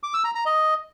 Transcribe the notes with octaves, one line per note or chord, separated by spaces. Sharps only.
D6
E6
A#5
A#5
D#5